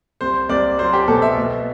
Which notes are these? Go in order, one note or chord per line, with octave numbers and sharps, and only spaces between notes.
C2 C5
C2 D5
F#3 C5
G4
B2 A4
E5
B2